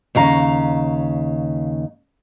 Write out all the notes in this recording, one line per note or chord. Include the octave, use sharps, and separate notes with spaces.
D#2 C#3 F5 A#5